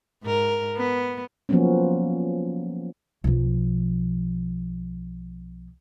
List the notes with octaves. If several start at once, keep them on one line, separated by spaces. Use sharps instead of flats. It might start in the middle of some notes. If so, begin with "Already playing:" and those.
G#2 A#4
B3
F3 F#3 A#3 B3 C#4
B1 F3